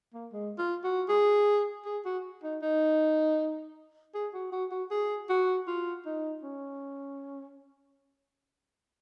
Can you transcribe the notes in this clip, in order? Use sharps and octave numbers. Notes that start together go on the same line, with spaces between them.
A#3
G#3
F4
F#4
G#4
G#4
F#4
D#4
D#4
G#4
F#4
F#4
F#4
G#4
F#4
F4
D#4
C#4